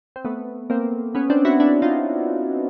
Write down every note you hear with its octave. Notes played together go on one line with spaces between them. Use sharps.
C4
A3 B3
A#3 C4
B3 C#4
C4 D4
E4 F#4
D4 E4
D#4 F4